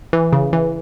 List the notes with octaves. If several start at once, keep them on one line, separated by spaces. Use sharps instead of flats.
E3
C#3
E3